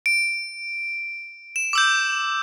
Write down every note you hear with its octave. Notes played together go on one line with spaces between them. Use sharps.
D7
E7
D6 E6 G6